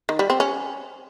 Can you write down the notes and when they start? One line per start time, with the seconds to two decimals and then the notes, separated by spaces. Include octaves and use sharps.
0.09 D#3
0.19 G3
0.30 C4
0.40 C#4